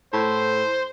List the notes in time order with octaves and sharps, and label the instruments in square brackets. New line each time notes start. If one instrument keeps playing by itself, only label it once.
[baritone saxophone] A2 [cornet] C5